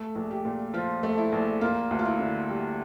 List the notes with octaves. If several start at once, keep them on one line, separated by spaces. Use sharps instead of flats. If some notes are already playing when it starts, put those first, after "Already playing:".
Already playing: A3
A#1
G4
A#2
F3 F4
A3
E4
A#1
A#3 F4
D2
F4
E4
D3
G3